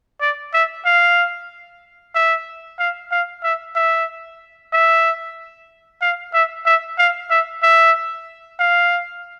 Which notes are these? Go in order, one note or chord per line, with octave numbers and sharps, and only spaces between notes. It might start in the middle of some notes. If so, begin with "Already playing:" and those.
D5
E5
F5
E5
F5
F5
E5
E5
E5
F5
E5
E5
F5
E5
E5
F5